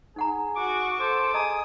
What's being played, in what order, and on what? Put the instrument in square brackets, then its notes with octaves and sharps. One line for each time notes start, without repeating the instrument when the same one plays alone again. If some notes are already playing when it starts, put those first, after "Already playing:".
[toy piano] D#4 F#5 A#5 [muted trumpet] G#4
[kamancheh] F#4 C#6 [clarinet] D6
[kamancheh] A4 [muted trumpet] C5 [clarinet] D6
[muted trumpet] G#4 [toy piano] D#5 A#5 [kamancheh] D#6